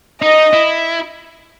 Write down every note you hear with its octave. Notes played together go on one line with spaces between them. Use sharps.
D#4 D#5
E4